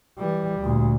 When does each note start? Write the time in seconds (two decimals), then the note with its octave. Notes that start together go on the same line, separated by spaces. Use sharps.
0.19 E3 G3
0.61 D2 A#2